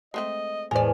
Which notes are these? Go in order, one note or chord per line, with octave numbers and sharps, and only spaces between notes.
G#3 A3 C4 D#5
E2 A2 G#3 A#4 C5 D5 G#5